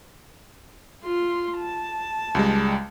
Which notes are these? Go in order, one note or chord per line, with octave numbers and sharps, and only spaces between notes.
F4 C6
A5
C#2 G3 G#3